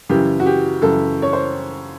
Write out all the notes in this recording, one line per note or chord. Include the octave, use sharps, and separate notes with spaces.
F#2 C#3 E3 G4
F#4
G4
F#2 C#3 E3 A4
C#5
C5